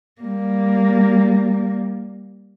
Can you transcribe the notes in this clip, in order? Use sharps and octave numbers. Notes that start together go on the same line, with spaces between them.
G3 A#3